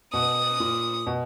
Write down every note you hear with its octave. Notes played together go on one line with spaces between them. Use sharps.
B2 D#6
A#2
B2